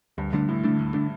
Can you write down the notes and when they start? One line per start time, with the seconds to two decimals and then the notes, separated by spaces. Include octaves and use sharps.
0.18 D2 G2
0.33 G2 D3 A3 D4
0.49 D2 A2
0.64 D3 A3 D4
0.79 D2
0.94 D3 A3 D4